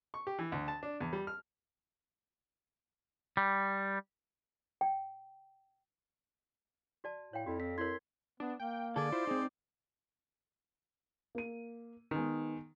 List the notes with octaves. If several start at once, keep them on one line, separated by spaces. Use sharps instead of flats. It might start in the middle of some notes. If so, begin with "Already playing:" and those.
C#6
G4
E3
D2
A5
D4
E2
G3
F6
G3
G5
F#4 D5 A5
A2 C#5 F5 G5
F2 E4 F#4
C4 B6
E4 A#4 C#5 C6 G#6
B3 D4
A#3 G5
D3 G#4 A4 D5
E4 F4 C5
C4 D#4 G#4
A#3 D#7
D#3 G#3 B3 D#4